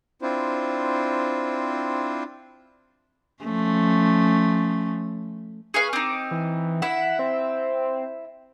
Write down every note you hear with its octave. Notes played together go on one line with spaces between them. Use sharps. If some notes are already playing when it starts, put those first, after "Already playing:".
C4 D4 E4 F4 C5
F3 A3 C#4
G#4 B4 F5 C#6
C4 D#4 D6
E3
E4 E5 F#5
C4